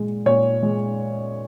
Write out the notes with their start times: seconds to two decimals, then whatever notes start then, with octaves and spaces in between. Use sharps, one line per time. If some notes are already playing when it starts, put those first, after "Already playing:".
Already playing: A#2 G#3
0.26 A#2 C#5
0.63 G#3